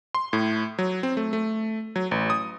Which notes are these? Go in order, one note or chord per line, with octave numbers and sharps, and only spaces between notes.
C6
A2
F#3
C4
A3
A3
F#3
A1
D#6